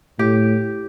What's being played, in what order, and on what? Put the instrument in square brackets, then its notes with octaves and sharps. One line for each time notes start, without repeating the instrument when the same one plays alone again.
[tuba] A2 [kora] G4